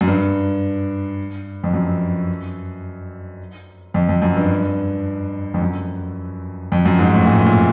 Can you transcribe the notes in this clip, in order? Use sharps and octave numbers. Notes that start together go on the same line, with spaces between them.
F#2
G2
F2
F#2
F2
F2
F#2
G2
F2
F#2
F2
F#2
G#2
A2
A#2
A2
A#2